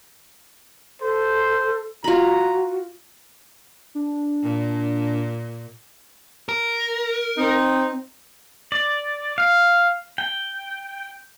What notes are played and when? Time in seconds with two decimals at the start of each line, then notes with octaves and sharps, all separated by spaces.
1.01 A4 C5
2.04 F4 F#4 A#5 B5
3.95 D4
4.43 A#2
6.49 A#4
7.37 C4 D#4
8.72 D5
9.38 F5
10.18 G5